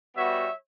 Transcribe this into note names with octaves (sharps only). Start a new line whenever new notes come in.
G3 B3 F#4 C#5 E5